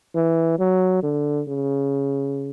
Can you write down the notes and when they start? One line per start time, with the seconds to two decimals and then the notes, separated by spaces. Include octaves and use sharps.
0.15 E3
0.59 F#3
1.03 D3
1.48 C#3